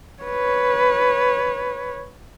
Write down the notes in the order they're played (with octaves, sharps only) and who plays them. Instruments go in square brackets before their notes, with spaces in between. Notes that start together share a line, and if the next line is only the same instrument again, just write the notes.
[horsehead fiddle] B4 C#5